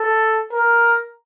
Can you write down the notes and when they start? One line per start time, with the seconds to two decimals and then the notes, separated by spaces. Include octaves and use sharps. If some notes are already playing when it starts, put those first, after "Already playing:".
Already playing: A4
0.52 A#4